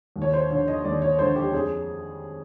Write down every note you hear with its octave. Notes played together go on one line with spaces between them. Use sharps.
D#2
C#5
C5
D3 F3 C#5
D#5
D#2 D5
C#5
D3 F3 C5
G4
F2 G#4